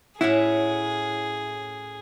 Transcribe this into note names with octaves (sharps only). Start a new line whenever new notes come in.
A2 C#4 E4 F#4 G#4